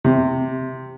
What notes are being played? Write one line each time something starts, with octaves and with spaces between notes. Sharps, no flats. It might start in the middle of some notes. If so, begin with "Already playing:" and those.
C3